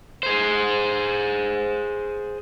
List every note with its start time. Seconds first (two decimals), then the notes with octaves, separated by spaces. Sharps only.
0.23 G#4 C5